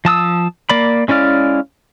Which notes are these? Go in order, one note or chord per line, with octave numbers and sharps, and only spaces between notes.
F3 A5 D#6 E6
A#3 D5 B5
G#3 C#4 E4 D5 F5